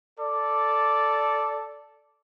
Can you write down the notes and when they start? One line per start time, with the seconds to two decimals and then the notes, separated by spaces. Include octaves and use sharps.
0.20 A4 D5